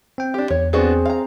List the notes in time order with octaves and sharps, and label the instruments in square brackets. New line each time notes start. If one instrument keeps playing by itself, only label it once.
[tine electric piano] C4 G5
[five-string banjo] D4 G4
[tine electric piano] E2 [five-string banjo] C#5
[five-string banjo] B3 D4 F#4 [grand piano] C4 G#4
[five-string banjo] F5 A#5